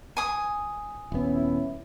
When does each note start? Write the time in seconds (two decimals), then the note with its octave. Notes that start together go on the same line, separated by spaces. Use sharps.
0.17 G#5 D#6
1.12 D#1 B3 C#4 E4